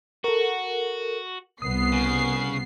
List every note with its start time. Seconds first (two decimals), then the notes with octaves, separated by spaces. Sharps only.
0.24 F#4 A4 A#4
1.62 C2 B3 D#6 C7
1.92 C#3